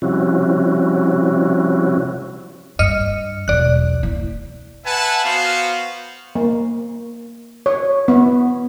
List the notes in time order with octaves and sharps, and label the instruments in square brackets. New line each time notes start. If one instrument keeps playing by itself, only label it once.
[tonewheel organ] C3 F3 G3 C#4 E4 F#4
[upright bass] G2 [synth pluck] D#5 F6 C#7
[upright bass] B1 E2 [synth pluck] D5 F#6
[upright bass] E4
[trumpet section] B4 E5 F#5 G#5 A5
B3 F#4 C5 F5
[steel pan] A#3
C#5
B3